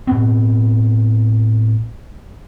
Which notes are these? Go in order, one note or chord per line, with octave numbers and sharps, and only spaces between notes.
A2 B3 C4